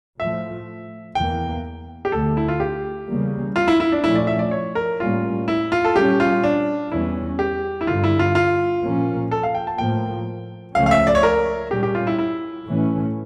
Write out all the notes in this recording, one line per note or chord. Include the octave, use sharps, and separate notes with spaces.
A2 F3 A3 E5
E2 E3 A#3 G5
G4
D2 D3 A3 A4
E4
F4
G4
E2 C#3 G3 A#3
F4
E4
E4
D4
A#2 F3 A3 C#4 E4
D5
E5
D5
C#5
A#4
A2 G3 A#3 C#4 F4
E4
F4
A4
A#2 G3 C#4 G4
F4
D4
E2 E3 G3 C#4 E4
G4
E4
G2 D3 G3 F4
E4
F4
F4
A#2 F3 A#3 C#4
A4
F5
G5
A5
A2 F3 A#3 G5
C#2 C#3 F3 A3 C#4 F5
F5
E5
D5
C#5
A#4
A#2 G3 C#4 G4
G4
F4
E4
E4
A2 E3 A3 C#4